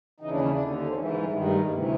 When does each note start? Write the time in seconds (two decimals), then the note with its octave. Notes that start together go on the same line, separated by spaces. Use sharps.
0.20 D#2 C#3 E3 D#4
0.30 D4
0.40 C#4
0.50 D4
0.58 D#2 D3
0.88 C4
0.95 G#2 E3 C#4
1.04 A#3
1.14 G#3
1.23 G3
1.32 G2 D#3 G#3
1.45 A3
1.51 G#3
1.70 D2 C3 E3 A#3